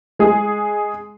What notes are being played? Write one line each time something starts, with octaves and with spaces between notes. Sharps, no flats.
G#3 G#4